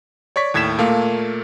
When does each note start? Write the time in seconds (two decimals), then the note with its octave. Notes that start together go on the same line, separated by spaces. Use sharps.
0.36 C#5 D5 C#6 B6
0.54 D#2 A2 G#6 B6 E7
0.78 A#2 A3 A#3 F5